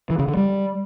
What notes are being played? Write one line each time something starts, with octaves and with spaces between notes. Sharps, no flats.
E3
C#3
D3
G3